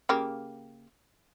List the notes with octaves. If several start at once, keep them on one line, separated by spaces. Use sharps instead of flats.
C#3 A#3 G4